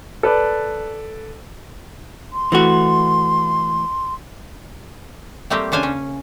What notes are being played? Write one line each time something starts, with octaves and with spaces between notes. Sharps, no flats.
A4 B4 D5
C6
E3 A3 F#4
G3 A3 A#3 C4 G4
C#3 D4 C5 F5 G#5
C#4